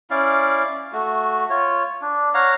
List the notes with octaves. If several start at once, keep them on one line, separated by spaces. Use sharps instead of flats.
C#4 E4 D5 F5
A3 F#4
F4 C#5
D4
C#5 F5 F#5 A#5